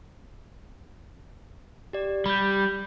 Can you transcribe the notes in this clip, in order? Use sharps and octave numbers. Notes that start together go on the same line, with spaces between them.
G4 D5
G3 B5 G6